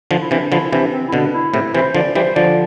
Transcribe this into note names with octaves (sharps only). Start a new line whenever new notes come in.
D3 F3
E4
C3 E3 D4
D3 F3 E4
C3 E3 D4
C4
E4
B2 D3 D4
E4
A2 C3 E4
C3 E3 C5
D3 F3 D5
E3 G3 C5
D3 F3 D5